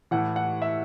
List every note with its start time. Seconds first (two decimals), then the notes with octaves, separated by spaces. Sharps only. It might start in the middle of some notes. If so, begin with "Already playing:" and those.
0.11 A2 E3 F#5
0.36 F#5
0.62 E5